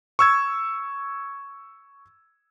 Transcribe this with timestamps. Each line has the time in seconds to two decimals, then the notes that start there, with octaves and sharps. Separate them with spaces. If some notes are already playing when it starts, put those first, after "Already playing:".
0.19 C#6 E6 G#6